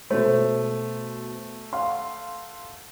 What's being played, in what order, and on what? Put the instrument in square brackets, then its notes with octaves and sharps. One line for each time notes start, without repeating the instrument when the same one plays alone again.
[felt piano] B2 C5 [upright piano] A3
[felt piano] F5 F#5 C6